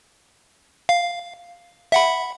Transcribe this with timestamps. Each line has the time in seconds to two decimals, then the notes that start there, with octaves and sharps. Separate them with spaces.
0.89 F5
1.92 E5 F#5 B5